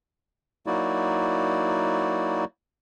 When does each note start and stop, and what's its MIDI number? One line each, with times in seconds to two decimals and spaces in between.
0.66 2.45 54
0.66 2.45 58
0.66 2.45 63
0.66 2.45 64
0.66 2.45 66
0.66 2.45 74